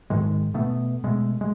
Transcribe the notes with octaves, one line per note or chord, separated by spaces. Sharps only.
G#2 D#3 G#3
B2 A3 B3
B2 G#3 A3
G#3